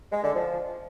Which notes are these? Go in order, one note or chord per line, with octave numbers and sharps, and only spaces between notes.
G#3
D3
F3